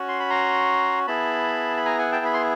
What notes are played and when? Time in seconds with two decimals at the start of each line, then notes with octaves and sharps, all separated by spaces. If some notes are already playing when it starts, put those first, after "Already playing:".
Already playing: C#4 F#4
0.08 C6
0.20 B5
0.30 A#5 C6
1.07 B3 E4 G#4 A5 B5
1.77 B5
1.85 G#5 A#5
1.99 F#5 G#5
2.12 G5 A5
2.25 B5
2.33 C6